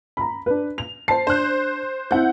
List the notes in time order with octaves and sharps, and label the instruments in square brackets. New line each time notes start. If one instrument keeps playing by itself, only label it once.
[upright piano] A#5 B5
D4 B4
F7
[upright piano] C5 A5 [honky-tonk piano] C7
[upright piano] D4 F#6 [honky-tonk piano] C5
[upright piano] C4 E4 [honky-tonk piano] F#5 G6